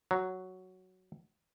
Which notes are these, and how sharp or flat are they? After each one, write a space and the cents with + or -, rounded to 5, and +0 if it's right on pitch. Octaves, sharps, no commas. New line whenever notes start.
F#3 +5